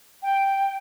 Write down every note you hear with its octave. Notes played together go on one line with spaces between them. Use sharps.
G5